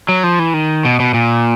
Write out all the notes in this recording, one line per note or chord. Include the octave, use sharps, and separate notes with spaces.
F#3
F3
E3
D#3
B2
B2
A#2